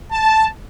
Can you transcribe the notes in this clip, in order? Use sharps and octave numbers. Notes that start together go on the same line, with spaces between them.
A5